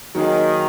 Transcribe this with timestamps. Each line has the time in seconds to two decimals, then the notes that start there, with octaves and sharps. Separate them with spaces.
0.15 D#3 F#3 A#3 D#4 G#4